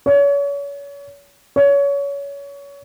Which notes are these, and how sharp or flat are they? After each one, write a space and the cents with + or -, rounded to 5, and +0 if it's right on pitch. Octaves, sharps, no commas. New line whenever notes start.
C#5 +35
C#5 +25